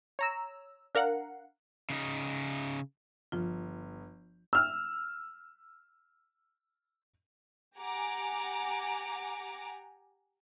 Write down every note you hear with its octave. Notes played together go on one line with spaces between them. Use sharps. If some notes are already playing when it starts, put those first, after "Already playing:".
C#5 A#5 E6
D4 A#4 F5 F#5
C#3 D#4
G1 F3 F4
E6 F6
G4 F#5 G#5 A#5 D6